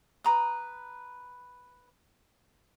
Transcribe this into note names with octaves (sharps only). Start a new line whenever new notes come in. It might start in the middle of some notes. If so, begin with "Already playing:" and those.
B4 A#5 D#6